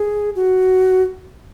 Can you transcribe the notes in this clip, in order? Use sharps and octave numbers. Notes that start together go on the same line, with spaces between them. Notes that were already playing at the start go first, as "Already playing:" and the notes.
Already playing: G#4
F#4